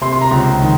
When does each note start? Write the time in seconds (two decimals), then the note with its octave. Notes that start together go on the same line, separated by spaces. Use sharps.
0.01 C3 C6
0.12 C6
0.21 A#5
0.31 C#2
0.62 D#3